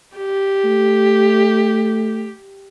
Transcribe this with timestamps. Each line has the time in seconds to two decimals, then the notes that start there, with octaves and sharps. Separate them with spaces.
0.17 G4
0.65 A3